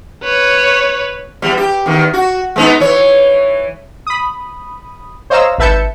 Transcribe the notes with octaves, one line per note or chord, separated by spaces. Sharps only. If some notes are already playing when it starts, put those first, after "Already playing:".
B4 C#5
E2 G3
G4
E2 D#3
F#4
G#3 B3 D#4
E3 C#5
B5 D#6
C5 C#5 D#5 F5 A#5 E6
G#1 B4 E5 A5 G6 C#7